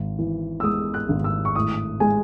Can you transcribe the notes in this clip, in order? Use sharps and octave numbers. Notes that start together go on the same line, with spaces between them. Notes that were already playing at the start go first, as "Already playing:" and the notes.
Already playing: G#1
E3
E6
G#3 D#6
F#6
G#1
E6
C#6
A2 D#6
G#3 G#5